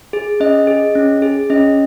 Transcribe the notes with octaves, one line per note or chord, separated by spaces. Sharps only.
G#4
C#4 D#5
G#4
C#4
G#4
C#4 D#5